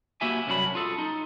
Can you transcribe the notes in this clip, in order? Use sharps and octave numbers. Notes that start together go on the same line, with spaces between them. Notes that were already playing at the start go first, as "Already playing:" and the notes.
A#3 E4 F#4 G4 E5 G#5
C2 F#2 C#4 D4 F#4 B5
F4 G#4 A4
D#4